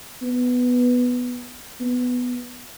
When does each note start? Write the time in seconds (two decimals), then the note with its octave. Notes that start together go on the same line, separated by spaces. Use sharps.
0.23 B3
1.80 B3